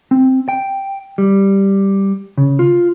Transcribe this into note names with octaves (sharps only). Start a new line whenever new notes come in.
C4
G5
G3
C#3
F4